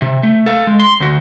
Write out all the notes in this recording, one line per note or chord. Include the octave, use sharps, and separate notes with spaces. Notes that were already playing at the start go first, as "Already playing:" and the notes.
C3
A3
A4 F5
G#3
C6
D2 F#4